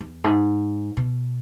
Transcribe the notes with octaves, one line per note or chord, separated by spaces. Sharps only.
E2
G#2
B2